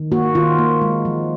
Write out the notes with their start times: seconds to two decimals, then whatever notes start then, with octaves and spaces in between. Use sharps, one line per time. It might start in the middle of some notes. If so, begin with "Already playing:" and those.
Already playing: D#3
0.12 A#3 F#4
0.35 D#3 F4
0.58 A#3
0.82 G#3
1.05 F3